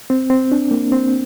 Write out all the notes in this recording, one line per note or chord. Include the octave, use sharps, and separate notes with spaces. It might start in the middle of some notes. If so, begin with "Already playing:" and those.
C4
C4
D4
A#3
C4